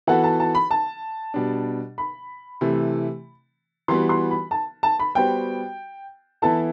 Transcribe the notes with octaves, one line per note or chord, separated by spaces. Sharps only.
E3 B3 F#4 A4 F#5
A5
A5
B5
A5
B2 G3 D4
B5
C3 E3 A3
E3 G3 B3 F#4 C6
C6
B5
A5
A5
B5
G3 B3 F#4 C5 G5
E3 B3 E4 A4 A5